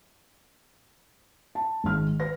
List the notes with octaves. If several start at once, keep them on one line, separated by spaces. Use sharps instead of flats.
A5
G#1 G#3 F6
B4 A#6